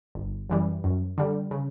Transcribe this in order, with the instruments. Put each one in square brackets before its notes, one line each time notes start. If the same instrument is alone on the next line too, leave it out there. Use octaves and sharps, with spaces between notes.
[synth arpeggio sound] G1
F#2 E3 G3
F#2
D3 G3
C#3